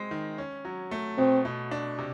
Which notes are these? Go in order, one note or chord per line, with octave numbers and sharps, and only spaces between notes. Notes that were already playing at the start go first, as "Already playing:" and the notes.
Already playing: G#3 C4
D#3
C#4
F#3
A3
B2 C4
B2
D4
C3